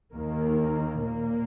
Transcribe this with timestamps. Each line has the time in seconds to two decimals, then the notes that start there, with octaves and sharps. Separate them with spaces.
0.14 D#2 D#3 A#3
1.02 A#2 A#3